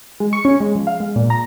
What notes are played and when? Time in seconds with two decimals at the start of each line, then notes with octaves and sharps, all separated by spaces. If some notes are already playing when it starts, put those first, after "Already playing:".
0.20 G#3
0.33 C#6
0.45 C#4
0.60 G#3
0.75 F3
0.87 F5
1.00 G#3
1.16 A#2
1.30 A#5